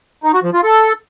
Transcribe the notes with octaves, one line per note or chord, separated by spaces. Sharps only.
D#4
F#4
F3
F4
A4